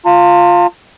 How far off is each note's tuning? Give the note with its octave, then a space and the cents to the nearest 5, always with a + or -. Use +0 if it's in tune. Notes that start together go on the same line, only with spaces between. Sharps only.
F4 +0 A5 +45